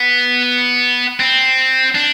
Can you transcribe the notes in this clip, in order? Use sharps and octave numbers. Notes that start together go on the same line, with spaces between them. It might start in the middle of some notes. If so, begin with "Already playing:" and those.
Already playing: B3
C4
D4